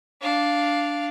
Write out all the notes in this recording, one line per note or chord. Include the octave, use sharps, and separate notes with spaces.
D4 F5